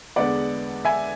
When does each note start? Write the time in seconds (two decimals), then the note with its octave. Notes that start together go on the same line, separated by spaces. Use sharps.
0.16 E2 D3 G#3 B3 D5 F#5
0.85 E5 G#5